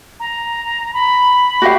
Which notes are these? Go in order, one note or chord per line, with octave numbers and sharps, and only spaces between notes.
A#5
B5
F#4 G4 F5